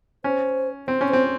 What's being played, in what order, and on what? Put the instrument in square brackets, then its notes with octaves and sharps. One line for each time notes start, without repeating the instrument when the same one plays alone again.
[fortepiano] C#4 [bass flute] C5
[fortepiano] C4 [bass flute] C5
[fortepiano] C#4
[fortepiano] C4 [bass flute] C5